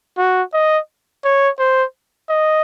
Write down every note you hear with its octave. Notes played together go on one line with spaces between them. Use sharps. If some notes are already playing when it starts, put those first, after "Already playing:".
F#4
D#5
C#5
C5
D#5